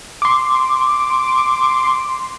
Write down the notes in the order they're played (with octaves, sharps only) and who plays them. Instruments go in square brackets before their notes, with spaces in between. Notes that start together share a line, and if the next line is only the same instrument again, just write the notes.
[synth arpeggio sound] C6 D6